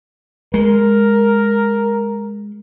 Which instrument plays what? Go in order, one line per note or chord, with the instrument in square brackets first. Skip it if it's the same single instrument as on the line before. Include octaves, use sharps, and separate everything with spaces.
[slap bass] G#3 [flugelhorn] A#4